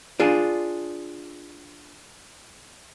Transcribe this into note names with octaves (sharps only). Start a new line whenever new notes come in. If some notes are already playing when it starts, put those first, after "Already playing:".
D4 F4 G#4